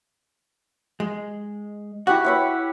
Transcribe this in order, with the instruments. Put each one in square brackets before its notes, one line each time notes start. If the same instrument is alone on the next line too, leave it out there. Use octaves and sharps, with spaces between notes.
[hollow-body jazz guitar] G#3
[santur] E4 G4 F#5 [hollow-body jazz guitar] F#4
[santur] B4 C#5 E5